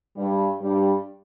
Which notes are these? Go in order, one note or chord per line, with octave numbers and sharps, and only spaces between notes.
G2 G3
G2 G3